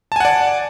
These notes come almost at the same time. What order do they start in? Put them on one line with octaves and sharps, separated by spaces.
A5 G#5 F#5 D5